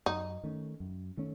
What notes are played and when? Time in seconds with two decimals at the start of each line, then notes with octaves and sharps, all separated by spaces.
0.06 F#2 D#4
0.44 D#3 A3 C#4
0.80 F#2
1.17 D#3 A3 C#4